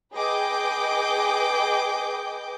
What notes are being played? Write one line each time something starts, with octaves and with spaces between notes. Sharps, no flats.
G#4 B4 D#5 G5 D6 G6